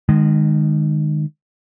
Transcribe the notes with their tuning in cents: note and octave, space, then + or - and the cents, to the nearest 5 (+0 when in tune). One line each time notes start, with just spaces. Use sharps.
D#3 -30 G#3 +0